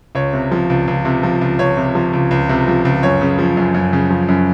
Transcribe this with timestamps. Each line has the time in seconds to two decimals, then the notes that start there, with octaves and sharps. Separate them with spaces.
0.15 C#2 C#5
0.33 C3
0.51 F3
0.70 C#2
0.87 C#2
1.05 C3
1.23 F3
1.41 C#2
1.59 C#2 C#5
1.77 C3
1.95 F3
2.13 C#2
2.31 C#2
2.49 C3
2.68 F3
2.85 C#2
3.03 F#2 C#5
3.21 C#3
3.39 F3
3.57 F#2
3.75 F#2
3.93 C#3
4.10 F3
4.29 F#2